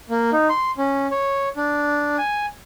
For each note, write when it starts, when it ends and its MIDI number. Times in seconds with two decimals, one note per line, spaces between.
0.10 0.30 58
0.33 0.48 63
0.49 0.71 84
0.78 1.07 61
1.11 1.49 73
1.57 2.17 62
2.18 2.46 80